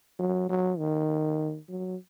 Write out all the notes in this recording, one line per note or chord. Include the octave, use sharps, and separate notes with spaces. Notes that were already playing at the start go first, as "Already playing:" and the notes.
F#3
F#3
D#3
F#3